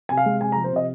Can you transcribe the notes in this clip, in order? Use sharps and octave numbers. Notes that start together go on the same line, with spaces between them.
C3 G#5
F5
G#3
C3 G#5
A#5
F3
C5
C3 D#5